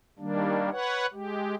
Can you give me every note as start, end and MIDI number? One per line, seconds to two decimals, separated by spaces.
0.19 0.70 51
0.19 0.70 55
0.19 0.70 58
0.19 0.70 62
0.72 1.06 71
0.72 1.06 73
0.72 1.06 78
1.13 1.55 56
1.13 1.55 67